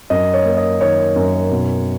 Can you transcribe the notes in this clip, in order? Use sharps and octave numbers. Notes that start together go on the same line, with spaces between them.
F#2 D#5
C#5
A#3
D#5
D#3 C#5
F#2
B2